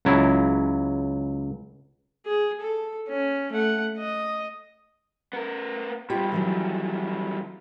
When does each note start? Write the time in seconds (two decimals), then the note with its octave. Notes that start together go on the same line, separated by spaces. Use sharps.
0.05 C#2 F#3 E4
2.26 G#4
2.60 A4
3.08 C#4
3.52 A3 F#5
3.98 D#5
5.33 B3 A#4
6.10 B2 G3 F4 G4 G5
6.32 D#3 E3 F#3